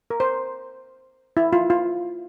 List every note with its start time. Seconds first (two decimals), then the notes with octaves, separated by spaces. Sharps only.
0.10 A#4
0.20 C5
1.37 E4
1.53 F4
1.70 F4